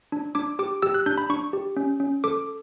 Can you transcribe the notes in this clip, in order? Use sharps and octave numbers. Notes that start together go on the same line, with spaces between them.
D4
D4 D6
G4 D6
G4 E6
F#6
D4 G6
B5
D4 C#6
G4
C#4
C#4
A4 D6